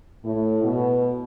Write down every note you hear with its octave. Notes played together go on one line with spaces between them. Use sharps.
A2
B2